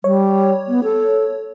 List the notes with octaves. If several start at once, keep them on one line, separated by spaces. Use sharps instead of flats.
G3 C#5
B3
A4